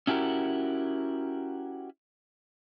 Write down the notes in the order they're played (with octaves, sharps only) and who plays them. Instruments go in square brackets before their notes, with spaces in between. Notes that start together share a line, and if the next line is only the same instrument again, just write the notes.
[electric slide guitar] C#4 E4 F#4 G4 A#4